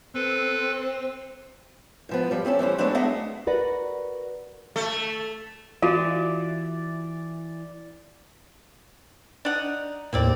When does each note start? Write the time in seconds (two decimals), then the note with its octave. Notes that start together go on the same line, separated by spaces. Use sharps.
0.15 C4 A4 B4
2.09 G#2 F3 B3
2.31 F3 G3
2.45 A3 C4 C#4 A4
2.59 E3 G3 C#4 C5
2.78 F#3 G#3 A3 B3 C4 D4
2.95 B3 D4 G#4 D#5 E5 F#5
3.47 F#4 A#4 B4 D5 F#5
4.76 A3
5.82 E3 F4 F#4 D5 F5
9.45 D4 D#4 F#5
10.13 D#2 A2 A#3 C4 D5